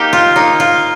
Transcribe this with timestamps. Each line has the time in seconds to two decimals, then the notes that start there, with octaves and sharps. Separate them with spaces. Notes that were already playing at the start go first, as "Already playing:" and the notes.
Already playing: A#3 D#4 G4
0.13 F4
0.36 A#3 D#4
0.60 F4